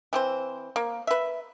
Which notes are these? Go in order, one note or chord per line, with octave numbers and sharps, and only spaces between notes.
E3 C4 C5
A#3
B4 E5